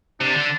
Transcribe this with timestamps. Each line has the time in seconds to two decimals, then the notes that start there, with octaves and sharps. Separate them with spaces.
0.21 C3 D4
0.35 D3